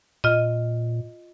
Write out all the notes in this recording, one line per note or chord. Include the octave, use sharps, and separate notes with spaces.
A#2 F4 D#5